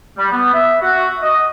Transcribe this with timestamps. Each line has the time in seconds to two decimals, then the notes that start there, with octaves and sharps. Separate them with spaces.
0.17 G3
0.32 B3
0.54 E5
0.82 F#4
1.22 D#5